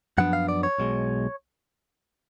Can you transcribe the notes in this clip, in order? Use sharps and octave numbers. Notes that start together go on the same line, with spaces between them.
F#2 F3 B3 D4 F#5
F5
D5
C#5
B1 B2 G#3